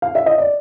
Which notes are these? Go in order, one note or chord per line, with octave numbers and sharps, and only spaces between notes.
F5
E5
D#5
D5